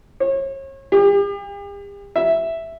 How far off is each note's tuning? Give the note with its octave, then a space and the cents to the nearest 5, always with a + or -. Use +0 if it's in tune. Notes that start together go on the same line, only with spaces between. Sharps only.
C#5 -35
G4 +45
E5 +0